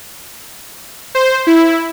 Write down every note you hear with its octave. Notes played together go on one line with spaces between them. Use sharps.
C5
E4